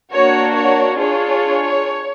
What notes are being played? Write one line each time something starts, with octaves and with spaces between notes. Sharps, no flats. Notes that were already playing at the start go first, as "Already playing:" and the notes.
A#3 D4 F#4 C#5
C#5
D4 F4 G#4 C#5